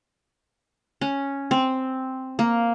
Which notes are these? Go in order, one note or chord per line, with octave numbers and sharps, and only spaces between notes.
C#4
C4
A#3